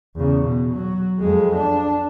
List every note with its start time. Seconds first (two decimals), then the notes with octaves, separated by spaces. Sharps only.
0.15 E2 C#3
0.44 B2
0.74 F#3
1.20 F2 G#3
1.56 D4